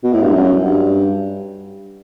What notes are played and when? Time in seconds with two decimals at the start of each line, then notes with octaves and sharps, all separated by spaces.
0.04 B2
0.13 A2
0.23 G2
0.33 F#2
0.64 G2